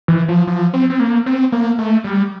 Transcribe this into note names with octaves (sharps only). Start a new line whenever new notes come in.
E3
F3
F3
C4
C4
A#3
C4
A#3
A3
G3